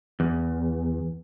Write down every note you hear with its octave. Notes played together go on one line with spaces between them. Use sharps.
E2